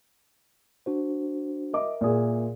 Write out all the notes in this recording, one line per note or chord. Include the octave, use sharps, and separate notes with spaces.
D4 F#4 C5
A#4 D#5 E5 D6
A#2 G#4